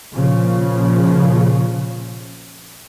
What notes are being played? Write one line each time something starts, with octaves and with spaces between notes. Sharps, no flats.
A#2 C#3 F3